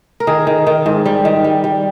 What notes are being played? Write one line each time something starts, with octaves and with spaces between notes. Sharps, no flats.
A#4
D#3 G#4
D#3
D#3
G#2
G3
D#3
G3
G3